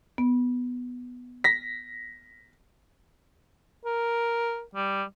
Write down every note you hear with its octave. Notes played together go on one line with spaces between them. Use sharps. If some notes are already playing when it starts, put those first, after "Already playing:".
B3
A#6 B6
A#4
G3